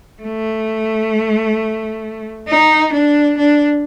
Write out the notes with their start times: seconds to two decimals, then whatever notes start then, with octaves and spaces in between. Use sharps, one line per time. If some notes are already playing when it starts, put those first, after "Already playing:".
0.23 A3
2.48 D#4
2.93 D4
3.38 D4